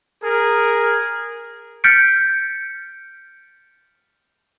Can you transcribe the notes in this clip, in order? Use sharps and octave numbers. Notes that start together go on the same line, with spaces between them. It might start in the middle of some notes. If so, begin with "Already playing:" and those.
G#4 A#4
F6 G6 A6 B6 C#7 D7